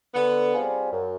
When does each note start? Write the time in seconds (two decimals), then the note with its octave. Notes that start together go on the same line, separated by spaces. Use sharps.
0.14 D3 B3
0.53 G3 C4 F4 G#4
0.92 F#2